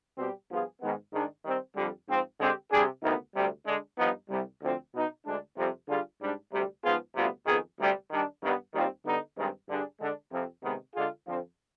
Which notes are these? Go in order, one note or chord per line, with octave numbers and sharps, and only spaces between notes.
B2 G3 C4 G4
G2 F3 B3 F4 G#4
G#2 D#3 G#3 B3
G#2 D#3 G#3 D4
D#3 G3 C4
F2 D3 G3
G#2 F3 C4
D3 G#3 C4 G4
C3 G3 D4 G#4
D2 C3 D#3 B3 D#4
D2 C3 G3
D3 G#3 D4
G2 F3 B3 D#4
C2 C3 G3
D2 D3 F3 C4
B2 B3 D#4
D2 D3 G#3 D4
F2 C3 G3 C4
D3 G3 D4 F4 G#4
G#2 G3 D4
D2 C3 G3
G#2 F3 B3 F4 G#4
D2 C3 G3 B3 F4
F2 D#3 B3 D#4 G#4
D2 C3 G3
D#3 G3 D4
G2 D#3 G3 B3
D#2 D#3 G3 C4 F4
D3 G3 B3 D#4
G2 D#3 G#3 C4
G2 D3 G3 D4 G#4
D3 G#3 D4
F2 C3 F3 C4
C3 D#3 G#3 B3
D3 G#3 D4 F4 G#4
F2 D3 F3 C4 F4